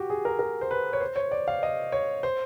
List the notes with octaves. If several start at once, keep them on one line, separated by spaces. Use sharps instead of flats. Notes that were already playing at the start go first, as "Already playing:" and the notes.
Already playing: F#4 G4
G#4
A#4
A#4
C5
B4
C#5
C5
C#5
D5
F5
D#5
C#5
C5